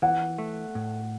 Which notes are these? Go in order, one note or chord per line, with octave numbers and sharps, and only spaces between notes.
E3 F#5
A3
A2